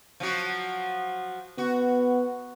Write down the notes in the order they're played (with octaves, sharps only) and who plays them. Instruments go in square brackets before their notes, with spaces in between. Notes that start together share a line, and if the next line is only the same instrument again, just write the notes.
[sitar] F3 F#3 F#4
[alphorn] B3 [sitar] F#4